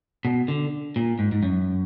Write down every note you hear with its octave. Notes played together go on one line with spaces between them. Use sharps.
B2
D3
A#2
G#2
G#2
F#2